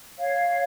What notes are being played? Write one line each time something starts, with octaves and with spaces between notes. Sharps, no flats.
C#5 F5